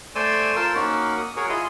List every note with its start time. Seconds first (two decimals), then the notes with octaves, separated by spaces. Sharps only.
0.15 A3 C5 D5 G#5 C6 E6
0.56 F4 A#4 C5 A5 C6 E6
0.74 A#3 C#4 D#4 F#4 A#4
1.17 D#6
1.37 F#4 G#4 A#4 C#5
1.49 E4 F4 G#4 D#5